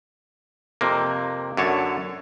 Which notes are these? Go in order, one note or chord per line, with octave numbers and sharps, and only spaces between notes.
F2 C3 A#3
F#2 D3 C#5 A5